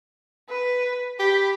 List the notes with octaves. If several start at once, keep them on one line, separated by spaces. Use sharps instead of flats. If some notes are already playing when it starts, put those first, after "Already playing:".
B4
G4 B5